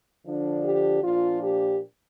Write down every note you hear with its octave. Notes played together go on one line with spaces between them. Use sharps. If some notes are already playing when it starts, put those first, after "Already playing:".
D3 F3 D4
G4
A#2 F3 D4 F4
G4